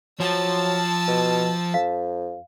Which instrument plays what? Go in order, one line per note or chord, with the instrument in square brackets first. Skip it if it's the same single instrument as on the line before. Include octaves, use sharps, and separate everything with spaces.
[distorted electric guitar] F3 [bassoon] F#3 [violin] A5 E6
[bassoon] B2
[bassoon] F2 [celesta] F5